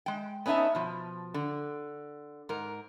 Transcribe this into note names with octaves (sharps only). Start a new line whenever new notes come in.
G#3 G5
B3 C#4 D#4 F4 E5 A5
B2 F3
D3
G#2 A#4